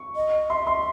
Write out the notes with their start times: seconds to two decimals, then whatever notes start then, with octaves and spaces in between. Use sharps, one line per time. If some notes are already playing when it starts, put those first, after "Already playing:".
Already playing: C#6
0.16 D#5
0.50 E5 C6
0.67 C6